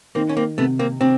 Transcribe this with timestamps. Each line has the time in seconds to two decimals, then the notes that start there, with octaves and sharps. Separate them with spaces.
0.15 D#3 A#3 C4
0.29 C#4
0.37 A#3 C4
0.58 C3 A3 B3
0.79 A#3 C4
1.01 C3 C4 D4